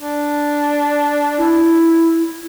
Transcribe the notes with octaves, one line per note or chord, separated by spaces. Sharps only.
D4
E4